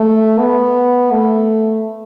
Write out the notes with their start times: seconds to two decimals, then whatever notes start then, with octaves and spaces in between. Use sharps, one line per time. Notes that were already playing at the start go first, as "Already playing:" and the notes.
Already playing: A3
0.39 B3
1.11 A3